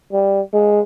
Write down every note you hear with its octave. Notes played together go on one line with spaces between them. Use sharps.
G3
G#3